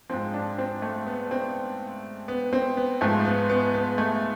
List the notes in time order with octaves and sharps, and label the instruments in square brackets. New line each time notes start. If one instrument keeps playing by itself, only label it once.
[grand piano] G#2 F3 C4
D4
C4
A3
B3
C4
B3
C4
B3
G#2 F3 A3
B3
B3
B3
A3